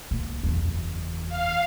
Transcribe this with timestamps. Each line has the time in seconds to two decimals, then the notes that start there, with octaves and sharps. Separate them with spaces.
0.11 C#2 A#2
0.43 F#1 E2
1.29 F5